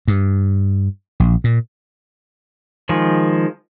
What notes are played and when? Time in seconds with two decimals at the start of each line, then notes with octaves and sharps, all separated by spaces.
0.08 G2
1.20 A#1
1.44 A#2
2.89 D#3 F3 G#3